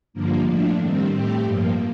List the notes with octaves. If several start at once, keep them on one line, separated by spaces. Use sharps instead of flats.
G2 D3 F3 A#3
A2 F3 A3 D4
D#3 G3 C4
A2 A3 C4 G4
G2 F3 A#3